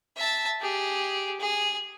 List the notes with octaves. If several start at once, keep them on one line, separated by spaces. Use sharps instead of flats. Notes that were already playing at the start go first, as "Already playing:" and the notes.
E5 A5
G4 G#4
G#4